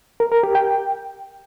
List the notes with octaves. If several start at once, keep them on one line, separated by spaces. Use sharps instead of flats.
A#4
A#4
G4
G5